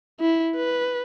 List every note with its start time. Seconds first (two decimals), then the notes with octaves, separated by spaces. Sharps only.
0.20 E4
0.56 B4